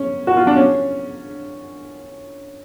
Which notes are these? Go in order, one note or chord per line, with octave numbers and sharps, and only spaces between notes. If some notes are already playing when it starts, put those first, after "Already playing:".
Already playing: C#4
F#4
F4
D4
C#4